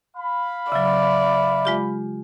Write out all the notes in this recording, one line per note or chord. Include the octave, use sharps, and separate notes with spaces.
F5 B5
C#3 F#3 D5 E5
G#3 F4 G4